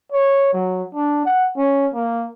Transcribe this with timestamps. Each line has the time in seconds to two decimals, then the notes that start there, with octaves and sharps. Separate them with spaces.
0.12 C#5
0.53 F#3
0.95 D4
1.26 F#5
1.57 C#4
1.94 A#3